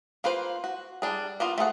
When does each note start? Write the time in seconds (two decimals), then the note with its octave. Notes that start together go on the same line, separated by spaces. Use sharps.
0.24 A#3 F4 B4 C5
0.64 F#4
1.02 G3 D4 G#4
1.40 A#3 B3 F4
1.58 A3 F4 G#4 F#5